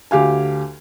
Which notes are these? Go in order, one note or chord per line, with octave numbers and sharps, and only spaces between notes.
D2 G4 F5 G#5